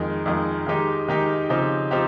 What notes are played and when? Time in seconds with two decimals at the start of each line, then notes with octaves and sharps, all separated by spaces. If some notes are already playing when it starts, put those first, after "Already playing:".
Already playing: F2 D#3 G#3
0.26 F2 D#3 G#3
0.67 D#3 G#3 D#4 G4
1.08 D#3 G#3 D#4 G4
1.49 C#3 F3 C4 D#4 G4
1.91 F3 C4 D#4 G4